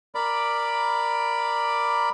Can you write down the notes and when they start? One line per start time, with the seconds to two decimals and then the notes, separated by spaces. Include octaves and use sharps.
0.15 A#4 D5 B5 D6